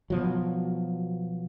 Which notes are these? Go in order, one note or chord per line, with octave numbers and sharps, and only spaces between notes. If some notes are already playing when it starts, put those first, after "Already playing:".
B2 F3 F#3